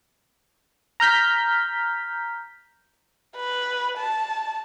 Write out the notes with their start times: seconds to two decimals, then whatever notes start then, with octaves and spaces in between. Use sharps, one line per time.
1.00 A#5 F6 G6 B6
3.36 B4
3.98 A5